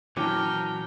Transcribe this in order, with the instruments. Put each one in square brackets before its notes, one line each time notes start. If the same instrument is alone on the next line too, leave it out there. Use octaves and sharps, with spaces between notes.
[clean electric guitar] A#2 F#3 C#4 [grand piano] E3 [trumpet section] A#4 G5 [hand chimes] A5 D6